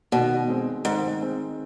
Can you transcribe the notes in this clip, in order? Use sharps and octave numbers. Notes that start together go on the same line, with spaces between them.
B2 D#3
G#3 C4
G#2 D#3
G#3 C4